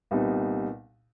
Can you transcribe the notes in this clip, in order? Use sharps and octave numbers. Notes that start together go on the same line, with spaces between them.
C2 A#2 G3 B3 D#4